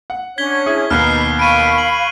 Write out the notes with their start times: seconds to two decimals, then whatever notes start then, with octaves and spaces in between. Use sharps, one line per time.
0.10 F#5
0.38 C#4 D4 C#5 G#6 B6 G7
0.66 E4 G#4
0.90 D#2 B2 D#4 A#4 B5 F6 F#6 C7
1.39 F5 B5 C#6 D7 D#7
1.78 F#7